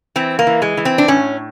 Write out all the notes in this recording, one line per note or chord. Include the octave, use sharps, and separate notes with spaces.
E3 C4
A#3
E3
G#3
E3
C4
D4
A2 C#4